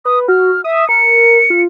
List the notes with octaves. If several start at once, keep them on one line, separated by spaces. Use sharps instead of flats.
B4 D#6
F#4 F6
E5 D#6
A#4 C#7
F4